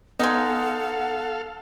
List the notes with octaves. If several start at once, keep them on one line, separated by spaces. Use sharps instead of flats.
G#3 B3 D#4 A4 F5 F#5